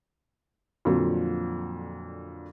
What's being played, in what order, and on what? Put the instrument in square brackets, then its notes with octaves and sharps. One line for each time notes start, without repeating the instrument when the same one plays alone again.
[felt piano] F2 A#2 D3 F3 F#3